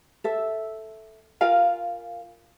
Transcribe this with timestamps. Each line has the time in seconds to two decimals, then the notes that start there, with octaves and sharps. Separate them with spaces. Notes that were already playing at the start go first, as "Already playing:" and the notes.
0.24 A4 E5
1.41 F4 A#4 F5 G#5